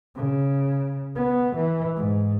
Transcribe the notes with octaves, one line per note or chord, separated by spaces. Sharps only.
C#3
B3
E3
G#2